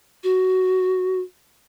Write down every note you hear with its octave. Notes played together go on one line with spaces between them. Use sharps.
F#4